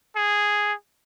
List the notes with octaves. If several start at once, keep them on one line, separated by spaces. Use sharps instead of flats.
G#4